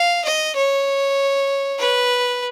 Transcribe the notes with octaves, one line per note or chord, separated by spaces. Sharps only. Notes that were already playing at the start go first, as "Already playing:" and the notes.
Already playing: F5
D#5
C#5
B4